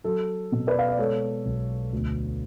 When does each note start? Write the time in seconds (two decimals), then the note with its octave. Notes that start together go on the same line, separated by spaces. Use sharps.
0.04 F#3 A4
0.52 B2
0.67 B4 D5
0.79 F5
0.89 D5
0.99 G#3 A4 C#5
1.45 B1
1.93 D2